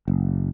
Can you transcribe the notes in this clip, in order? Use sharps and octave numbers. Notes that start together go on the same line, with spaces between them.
F#1